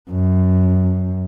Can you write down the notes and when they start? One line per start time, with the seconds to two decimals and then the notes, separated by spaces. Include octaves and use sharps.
0.11 F#2